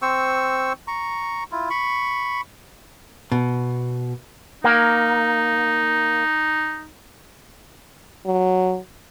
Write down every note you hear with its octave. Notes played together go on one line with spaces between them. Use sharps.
C4 C5 C#6 E6
A#5 C#6
E4 F4
B5 C#6
B2
A#3 D#4
F#3